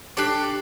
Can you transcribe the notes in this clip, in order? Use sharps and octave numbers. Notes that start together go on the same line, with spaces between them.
D4 G4 A4 D5